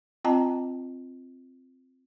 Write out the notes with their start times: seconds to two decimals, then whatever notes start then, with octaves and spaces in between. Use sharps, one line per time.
0.25 C4 F4 D#5 G5 A5 A#5